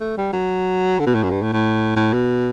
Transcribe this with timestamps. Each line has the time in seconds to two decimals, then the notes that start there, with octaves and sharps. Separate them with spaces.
0.01 A3
0.17 G3
0.33 F#3
0.99 D3
1.06 B2
1.15 A2
1.23 F#2
1.31 G2
1.42 A2
1.53 A2
1.96 A2
2.13 B2